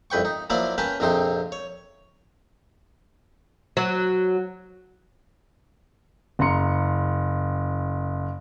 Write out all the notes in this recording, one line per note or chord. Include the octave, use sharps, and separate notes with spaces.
C2 F2 B4 G5 C#6
D#4
F3 F#3 A#3 E4 F4 D5
C#4 A#4 B4 G5 A5
A#1 F2 C3 C4 D#4 C6
C#5
F#3
F#1 C#3 A#5 C6 C#7